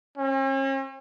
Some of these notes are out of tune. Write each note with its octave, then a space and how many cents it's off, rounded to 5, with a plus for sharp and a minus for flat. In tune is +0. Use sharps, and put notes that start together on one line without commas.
C#4 -45